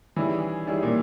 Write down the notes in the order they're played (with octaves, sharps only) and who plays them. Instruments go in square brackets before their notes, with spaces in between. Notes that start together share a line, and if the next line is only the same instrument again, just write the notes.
[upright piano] D#3 G3 C#4 E4 G#4 [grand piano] E3
[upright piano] D#3 G3 C#4 E4 G#4
[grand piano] A#2